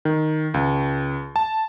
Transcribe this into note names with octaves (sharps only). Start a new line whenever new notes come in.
D#3
C#2
A5